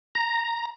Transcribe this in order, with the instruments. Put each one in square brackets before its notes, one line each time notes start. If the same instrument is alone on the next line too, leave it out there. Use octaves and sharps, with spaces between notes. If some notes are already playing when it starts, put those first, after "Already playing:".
[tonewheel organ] A#5